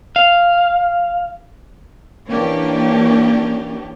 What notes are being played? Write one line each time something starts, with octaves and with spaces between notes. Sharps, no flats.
F5
E3 A#3 C#4 D4 G4